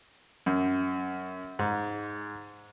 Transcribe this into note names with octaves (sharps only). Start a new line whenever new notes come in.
F#2
G#2